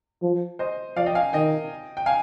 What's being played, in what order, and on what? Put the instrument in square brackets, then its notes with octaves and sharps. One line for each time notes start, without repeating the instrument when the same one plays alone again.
[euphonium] F3
[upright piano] C5 D#5
[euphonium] F3 [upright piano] D5 F5
[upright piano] D#5 G5
F5 G#5
[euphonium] D#3 [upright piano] D#5 G5
[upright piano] G5
F5 G#5